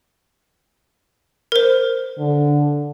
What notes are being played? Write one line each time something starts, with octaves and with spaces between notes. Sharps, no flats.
A#4 C5
D3